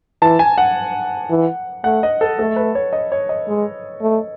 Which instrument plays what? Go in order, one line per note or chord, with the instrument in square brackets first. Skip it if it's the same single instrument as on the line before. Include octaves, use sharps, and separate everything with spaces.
[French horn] E3 [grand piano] A5
[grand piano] G#5
F#5
[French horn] E3
[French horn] A3 [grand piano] F#5
[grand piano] D#5
A4
[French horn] A3 [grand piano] A4
[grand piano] B4
C#5
D#5
C#5
D#5
[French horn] G#3
A3